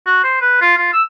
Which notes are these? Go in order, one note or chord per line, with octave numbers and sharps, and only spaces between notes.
F#4
C5
B4
F4
F4
E6